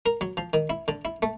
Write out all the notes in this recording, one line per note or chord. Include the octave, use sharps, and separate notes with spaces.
A#4
F#3
F3
D#3
E4
D3
E4
A3